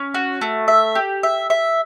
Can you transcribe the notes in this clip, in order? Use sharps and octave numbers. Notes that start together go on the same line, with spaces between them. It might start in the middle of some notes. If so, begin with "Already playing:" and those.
Already playing: C#4
F#4
A3
E5
G4
E5
E5